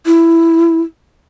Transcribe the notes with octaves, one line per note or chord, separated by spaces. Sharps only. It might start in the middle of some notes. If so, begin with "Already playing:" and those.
E4